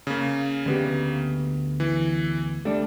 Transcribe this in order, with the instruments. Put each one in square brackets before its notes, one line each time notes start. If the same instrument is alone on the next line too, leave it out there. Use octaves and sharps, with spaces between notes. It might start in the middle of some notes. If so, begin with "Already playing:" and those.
[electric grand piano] C#3 A#3
[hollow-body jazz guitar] D2 B3 G4
[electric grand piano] E3
[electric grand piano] G3 [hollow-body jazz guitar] A3 D4